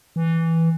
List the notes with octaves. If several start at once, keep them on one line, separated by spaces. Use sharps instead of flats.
E3